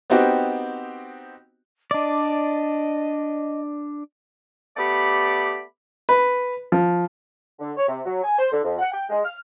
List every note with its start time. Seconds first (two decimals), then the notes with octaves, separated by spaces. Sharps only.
0.10 B3 C4 D#4 F#4 G4
1.91 D4 D5 D#5
4.77 A3 B3 G4 D5 B5 D6
6.09 B4
6.72 F3
7.60 D3
7.77 C#5
7.88 C3
8.05 F#3
8.23 G#5
8.39 C5
8.52 D3
8.64 F2
8.79 F#5
8.92 G5
9.10 G#3
9.24 F6